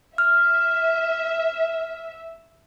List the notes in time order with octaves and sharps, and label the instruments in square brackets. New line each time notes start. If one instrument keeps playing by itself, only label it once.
[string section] E5 [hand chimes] F6